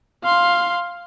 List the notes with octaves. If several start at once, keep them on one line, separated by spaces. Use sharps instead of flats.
F5 C6